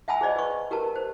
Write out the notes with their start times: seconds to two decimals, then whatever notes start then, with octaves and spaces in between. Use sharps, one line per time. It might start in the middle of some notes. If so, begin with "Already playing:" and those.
0.08 E5 F#5 G#5 A5 B5 E6
0.21 G#4 C5 D5 D#5
0.36 B4 C#6
0.71 G4 A#4 B4 A5
0.95 C5